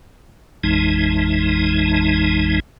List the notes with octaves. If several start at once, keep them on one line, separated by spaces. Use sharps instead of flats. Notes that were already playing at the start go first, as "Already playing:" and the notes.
A1 F2 E3 G#3 D#4